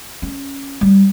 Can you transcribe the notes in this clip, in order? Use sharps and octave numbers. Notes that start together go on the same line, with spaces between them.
C#4
G3